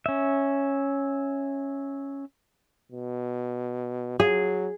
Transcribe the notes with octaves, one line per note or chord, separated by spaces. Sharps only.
C#4 E5
B2
F#3 G#4